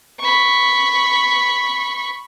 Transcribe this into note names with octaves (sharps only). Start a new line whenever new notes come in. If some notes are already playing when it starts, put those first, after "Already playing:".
B5 C#6